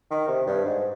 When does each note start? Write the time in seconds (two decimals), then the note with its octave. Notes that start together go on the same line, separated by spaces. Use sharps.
0.11 D#3
0.28 C3
0.46 G2
0.65 G#2